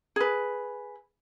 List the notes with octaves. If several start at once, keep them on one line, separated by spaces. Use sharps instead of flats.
G#4 B4